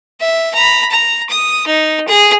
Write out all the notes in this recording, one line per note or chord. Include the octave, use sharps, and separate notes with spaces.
E5
A#5 B5
A#5
D#6
D#4
G#4